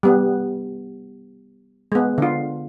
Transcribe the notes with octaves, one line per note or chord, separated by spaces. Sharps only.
G3 B3
G#3 B3
D3 F4